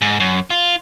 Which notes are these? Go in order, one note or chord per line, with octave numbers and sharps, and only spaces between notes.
G#2
F#2
F4